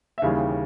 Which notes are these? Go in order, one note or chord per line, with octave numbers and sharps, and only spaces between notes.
E5
D#2 C#3 E3 G3 F5